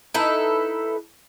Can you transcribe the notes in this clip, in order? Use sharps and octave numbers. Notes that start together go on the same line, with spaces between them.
D#4 E4 A4 B4